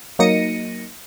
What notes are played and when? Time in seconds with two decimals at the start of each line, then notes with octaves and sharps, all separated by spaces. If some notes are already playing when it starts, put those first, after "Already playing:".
0.19 F#3 A#3 D#4 A#6 C#7 D#7